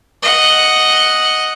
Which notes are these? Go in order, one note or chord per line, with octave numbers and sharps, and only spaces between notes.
D#5 F#5